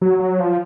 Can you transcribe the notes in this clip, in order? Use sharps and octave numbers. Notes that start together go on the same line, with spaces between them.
F#3
F#3
F3